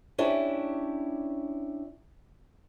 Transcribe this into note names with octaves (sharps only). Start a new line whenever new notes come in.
C#4 D4 E4 G4